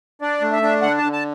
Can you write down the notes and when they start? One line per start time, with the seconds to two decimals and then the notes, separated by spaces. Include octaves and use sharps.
0.22 D4 D5
0.42 A3
0.52 E5
0.62 D4
0.82 D3 F#5
0.98 D3 A5
1.13 A5